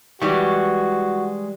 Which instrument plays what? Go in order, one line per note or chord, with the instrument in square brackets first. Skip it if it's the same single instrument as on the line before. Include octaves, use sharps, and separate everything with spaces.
[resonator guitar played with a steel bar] E3 G3 [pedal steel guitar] G#3 E5 C#6 [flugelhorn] F#4